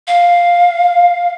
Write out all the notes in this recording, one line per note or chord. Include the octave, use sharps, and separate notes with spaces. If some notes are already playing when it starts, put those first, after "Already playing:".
F5